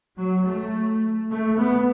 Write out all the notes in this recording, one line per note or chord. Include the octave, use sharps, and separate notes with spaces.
F#3
A3
A3
B3